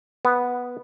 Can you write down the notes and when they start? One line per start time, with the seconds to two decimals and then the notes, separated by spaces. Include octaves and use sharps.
0.25 B3